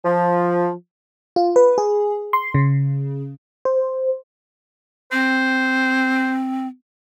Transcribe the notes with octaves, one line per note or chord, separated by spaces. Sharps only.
F3
F4
B4
G#4
C6
C#3
C5
C4 C5